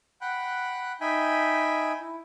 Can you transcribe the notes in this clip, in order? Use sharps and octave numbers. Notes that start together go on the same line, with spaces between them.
F#5 G5 B5 F#6
D#4 E5 G5 G#5 B5
E4